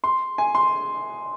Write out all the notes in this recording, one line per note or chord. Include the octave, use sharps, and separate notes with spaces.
C6
G#5
C6